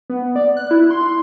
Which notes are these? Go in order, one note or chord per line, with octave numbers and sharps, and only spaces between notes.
B3
D5
F#6
E4
C6